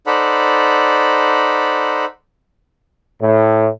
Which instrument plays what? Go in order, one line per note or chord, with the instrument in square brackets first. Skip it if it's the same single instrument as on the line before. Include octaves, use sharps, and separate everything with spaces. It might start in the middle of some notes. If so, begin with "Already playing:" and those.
[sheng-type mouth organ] D#4 A4 C5 D5 F#5 B5
[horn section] A2